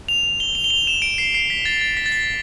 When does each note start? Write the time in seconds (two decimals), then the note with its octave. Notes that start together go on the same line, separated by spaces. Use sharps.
0.08 F7
0.40 G7
0.55 F7
0.64 G7
0.70 F7
0.87 E7
1.02 D7
1.18 C7
1.34 C7
1.50 B6
1.65 A6
1.81 A6
1.97 B6
2.06 A6
2.12 B6